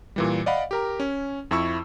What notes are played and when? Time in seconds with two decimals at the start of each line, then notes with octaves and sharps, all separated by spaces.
0.16 A#2 E3 G3
0.46 D5 D#5 F5 F#5 B5
0.71 G4 A#4 A#5
1.00 C#4
1.51 F2 E4 C#6 E6